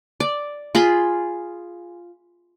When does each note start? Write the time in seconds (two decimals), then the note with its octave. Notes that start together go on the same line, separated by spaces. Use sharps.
0.20 D5
0.75 F4 G#4 B5 C6